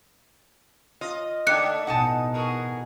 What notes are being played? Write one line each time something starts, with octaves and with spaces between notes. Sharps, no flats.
F4 D#5
D3 A3 D4 D#4 G5 F#6 C#7
A1 B2 D#4 F#5 G#5 A5
F#4 G#4 A#4